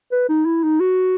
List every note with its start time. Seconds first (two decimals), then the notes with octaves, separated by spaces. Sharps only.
0.12 B4
0.29 D#4
0.46 E4
0.64 D#4
0.80 F#4